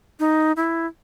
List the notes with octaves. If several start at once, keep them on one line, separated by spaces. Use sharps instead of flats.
D#4
E4